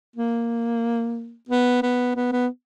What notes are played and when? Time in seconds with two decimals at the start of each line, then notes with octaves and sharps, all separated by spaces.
0.16 A#3
1.49 B3
1.82 B3
2.16 B3
2.32 B3